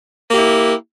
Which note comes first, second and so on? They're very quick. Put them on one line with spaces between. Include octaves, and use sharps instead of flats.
A#3 G4 E4